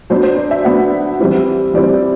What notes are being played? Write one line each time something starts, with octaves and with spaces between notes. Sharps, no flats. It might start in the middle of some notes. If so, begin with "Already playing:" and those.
F#3 B3 D4 C5
C5
D5
E5
F#3 B3 D4 F#5
E3 G3 C4 E4
E3 G3 C4 E4 D5